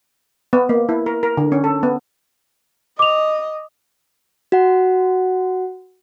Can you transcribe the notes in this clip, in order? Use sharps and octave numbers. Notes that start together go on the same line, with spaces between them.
B3
A#3
E4
A#4
A#4
D3
C#4
A4
B3
D#5 D6 F7
F#4 F#5